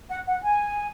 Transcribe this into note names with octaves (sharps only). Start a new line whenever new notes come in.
F#5
F#5
G#5